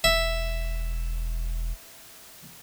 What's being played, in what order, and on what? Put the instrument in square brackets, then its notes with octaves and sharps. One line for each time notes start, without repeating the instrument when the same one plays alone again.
[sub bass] E1 [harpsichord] E5